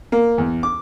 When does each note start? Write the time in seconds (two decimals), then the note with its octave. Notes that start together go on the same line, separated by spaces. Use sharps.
0.12 A#3
0.38 E2
0.63 D6